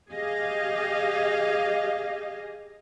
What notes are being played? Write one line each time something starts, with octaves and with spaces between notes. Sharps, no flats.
G4 G#4 D#5 F5